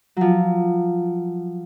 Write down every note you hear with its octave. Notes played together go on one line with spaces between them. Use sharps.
F3 F#3